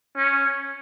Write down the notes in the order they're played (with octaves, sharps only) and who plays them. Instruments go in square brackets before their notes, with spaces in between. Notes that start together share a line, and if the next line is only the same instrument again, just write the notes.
[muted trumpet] C#4